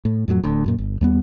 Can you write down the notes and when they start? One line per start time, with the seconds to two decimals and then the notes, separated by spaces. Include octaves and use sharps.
0.05 A2
0.28 F2 A2 E3 F#3
0.44 D1 D2
0.66 F#2 A#2
0.78 G1
1.01 D#2 G3 B3